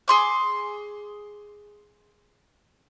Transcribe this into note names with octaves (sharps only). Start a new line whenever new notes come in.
G#4 C6 D6